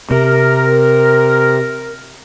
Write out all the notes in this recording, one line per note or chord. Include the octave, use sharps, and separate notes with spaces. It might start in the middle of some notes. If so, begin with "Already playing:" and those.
C3 A#4